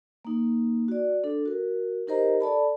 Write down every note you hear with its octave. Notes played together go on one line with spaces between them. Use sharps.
A#3 D#4
F#4 D5
D4 A4
F#4 A#4
D#4 G4 A#4 C5 D#5 A#5
A4 D5 A5 B5